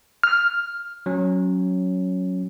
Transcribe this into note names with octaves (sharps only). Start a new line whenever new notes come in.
F6
F#3 C#4